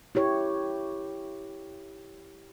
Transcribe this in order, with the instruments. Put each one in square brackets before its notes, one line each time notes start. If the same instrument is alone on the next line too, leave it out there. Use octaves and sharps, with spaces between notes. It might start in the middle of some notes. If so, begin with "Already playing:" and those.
[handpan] E4 G4 C#5